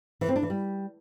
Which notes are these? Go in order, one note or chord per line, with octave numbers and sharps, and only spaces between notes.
E3
C4
D4
E3
G3